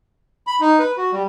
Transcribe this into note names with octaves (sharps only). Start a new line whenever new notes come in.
B5
D#4
B4
F#4
G3